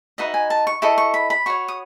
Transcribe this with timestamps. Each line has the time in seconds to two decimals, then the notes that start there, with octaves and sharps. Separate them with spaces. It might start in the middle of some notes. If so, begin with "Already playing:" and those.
0.18 D#4 F#4 B4 D#5 E5
0.34 G#5
0.50 A5
0.67 C#6
0.82 E4 A4 D#5 C#6
0.98 C#6
1.14 B5
1.30 B5
1.46 F#4 C#5 C#6
1.68 D#6